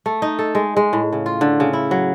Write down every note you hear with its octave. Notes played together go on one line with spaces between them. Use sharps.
A3
D#4
A4
G#3
G#3
A2
C#3
F4
D3
C#3
E4
F#3